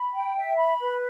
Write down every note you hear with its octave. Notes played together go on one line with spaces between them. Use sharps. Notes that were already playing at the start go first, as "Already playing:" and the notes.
Already playing: B5
G5
E5
B5
B4